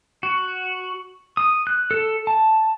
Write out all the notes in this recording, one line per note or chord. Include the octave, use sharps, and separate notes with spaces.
F#4
D#6
F#6
A4
A5